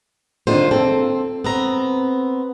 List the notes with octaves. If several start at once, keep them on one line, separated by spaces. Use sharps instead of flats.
D3 D#3 A#3 F4 C5
C4 A4
B3 C4 A#5